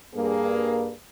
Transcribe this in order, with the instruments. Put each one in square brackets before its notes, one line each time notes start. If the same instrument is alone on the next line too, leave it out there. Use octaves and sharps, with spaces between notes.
[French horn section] G2 A#3 G#4